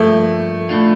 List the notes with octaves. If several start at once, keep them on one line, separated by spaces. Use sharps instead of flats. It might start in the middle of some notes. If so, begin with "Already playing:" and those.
Already playing: G2 F3 A3 A#3
A2 A3 D4 F4